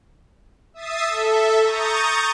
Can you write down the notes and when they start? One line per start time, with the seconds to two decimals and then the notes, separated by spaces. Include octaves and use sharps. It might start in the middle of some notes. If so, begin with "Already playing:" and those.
0.74 E5 D#6 A6 C7
1.07 A4 E5
1.60 A#5 C#6 D#6 G6 A6